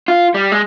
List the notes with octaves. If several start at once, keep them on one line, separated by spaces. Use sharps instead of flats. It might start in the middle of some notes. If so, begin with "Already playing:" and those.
F4
G3
G#3